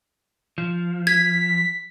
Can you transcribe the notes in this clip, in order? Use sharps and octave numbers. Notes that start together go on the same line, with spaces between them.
F3
G#6 B6